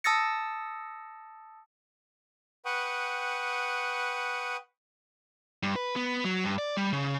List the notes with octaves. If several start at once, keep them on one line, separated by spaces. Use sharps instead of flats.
A5 D#6 E6 A6 A#6 C#7
B4 F#5 G5 C#6 D#6
G2
B4
B3
F#3
G2
D5
G3
C#3